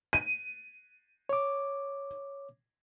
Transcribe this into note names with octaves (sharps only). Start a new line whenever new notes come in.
D#7
C#5 D6